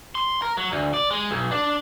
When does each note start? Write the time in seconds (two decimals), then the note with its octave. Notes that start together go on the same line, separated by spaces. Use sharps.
0.15 C6
0.42 A#4
0.57 F#3
0.72 D2
0.94 D5
1.11 G#3
1.31 B1
1.51 D4